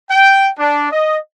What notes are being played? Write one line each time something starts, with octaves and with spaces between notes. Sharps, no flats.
G5
D4
D#5